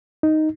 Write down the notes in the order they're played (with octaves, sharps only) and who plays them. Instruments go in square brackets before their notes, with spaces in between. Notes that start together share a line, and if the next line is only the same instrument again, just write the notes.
[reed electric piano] D#4